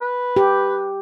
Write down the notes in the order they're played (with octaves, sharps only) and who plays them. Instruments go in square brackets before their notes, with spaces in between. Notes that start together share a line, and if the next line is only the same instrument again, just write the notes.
[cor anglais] B4
[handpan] G4